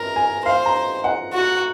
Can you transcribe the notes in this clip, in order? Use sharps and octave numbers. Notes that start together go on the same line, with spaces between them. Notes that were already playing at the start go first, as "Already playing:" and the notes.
Already playing: A#4 A#5
G#5
C5 F5
A#5
F#5
F#4